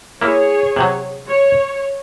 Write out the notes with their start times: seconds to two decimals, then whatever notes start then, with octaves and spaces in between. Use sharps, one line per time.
0.21 A#3 E4 G#4 C#5
0.76 C3 F#3
1.26 C#5